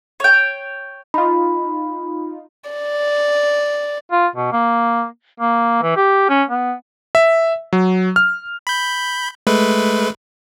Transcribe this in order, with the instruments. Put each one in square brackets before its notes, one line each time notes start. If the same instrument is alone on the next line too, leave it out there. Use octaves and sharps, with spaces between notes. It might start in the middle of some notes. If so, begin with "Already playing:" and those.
[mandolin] C#5 G5
[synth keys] D#4 F4 [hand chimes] B5
[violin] D5
[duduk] F4
B2
A#3
A#3
E3
G4
C#4
B3
[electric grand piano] E5
F#3
F6
[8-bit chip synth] B5 G6
G#3 A3 B4